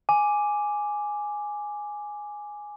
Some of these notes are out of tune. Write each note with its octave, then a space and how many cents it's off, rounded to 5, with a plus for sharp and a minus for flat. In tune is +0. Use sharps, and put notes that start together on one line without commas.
G#5 +0 D6 +0